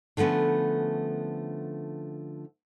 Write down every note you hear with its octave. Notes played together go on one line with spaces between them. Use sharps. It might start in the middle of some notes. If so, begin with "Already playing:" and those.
D3 F3 A3 B3 C#4